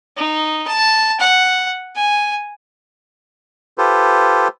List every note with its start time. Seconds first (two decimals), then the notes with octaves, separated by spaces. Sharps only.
0.17 D#4
0.68 A5
1.20 F#5
1.96 G#5
3.78 F4 G4 A4 B4 C5